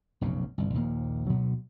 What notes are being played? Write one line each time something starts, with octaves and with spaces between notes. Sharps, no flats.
F1 B1 F#2 C#3
G1 C2
A#1 D#2 F3 A#3
D2 B2 F#3 B3